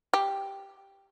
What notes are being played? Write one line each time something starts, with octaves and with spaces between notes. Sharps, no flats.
G4